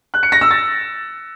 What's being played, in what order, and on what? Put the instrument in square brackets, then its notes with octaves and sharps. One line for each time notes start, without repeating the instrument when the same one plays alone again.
[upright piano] F#6
C#7
A#6
E6
A6